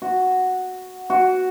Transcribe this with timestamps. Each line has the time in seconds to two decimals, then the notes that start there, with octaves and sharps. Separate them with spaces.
0.02 F#4
1.10 F#4